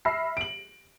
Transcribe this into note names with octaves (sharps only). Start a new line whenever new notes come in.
E5 B5 E6 F6 A#6 C7
D7 F#7